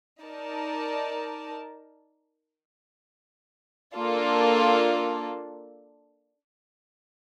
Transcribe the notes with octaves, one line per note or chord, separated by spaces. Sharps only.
D#4 A#4 D5 A5
A#3 D4 F4 A4